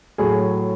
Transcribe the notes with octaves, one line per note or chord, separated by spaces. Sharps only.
A2 F#3 G#4